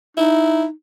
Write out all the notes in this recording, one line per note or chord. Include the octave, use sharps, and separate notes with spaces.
D#4 E4